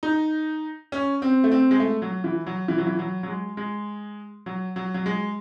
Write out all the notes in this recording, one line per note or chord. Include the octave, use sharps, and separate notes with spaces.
D#4
C#4
C4
A3
C4
G#3
A3
F#3
E3
F#3
E3
F#3
E3
F#3
F#3
G#3
G#3
F#3
F#3
F#3
G#3